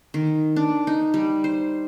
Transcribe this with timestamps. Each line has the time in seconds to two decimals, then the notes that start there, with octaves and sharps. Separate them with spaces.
0.14 D#3
0.56 D4
0.87 D#4
1.14 G3
1.44 C5